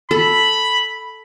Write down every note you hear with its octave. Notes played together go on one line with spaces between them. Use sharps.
A4 B5